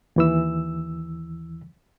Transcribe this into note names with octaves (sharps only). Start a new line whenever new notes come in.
D#2 E3 E6